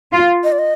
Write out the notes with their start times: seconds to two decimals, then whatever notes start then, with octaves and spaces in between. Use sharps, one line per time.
0.13 F4
0.44 D#5
0.52 D5
0.59 D#5